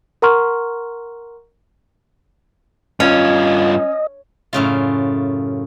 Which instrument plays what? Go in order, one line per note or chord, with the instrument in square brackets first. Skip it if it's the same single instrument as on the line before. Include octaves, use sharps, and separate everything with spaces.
[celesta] A#4 F#5 A#5 C6 C#6 F6
[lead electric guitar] G2 F4 [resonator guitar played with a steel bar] C#4 [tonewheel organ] D#5
[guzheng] F#2 A2 C#3 F4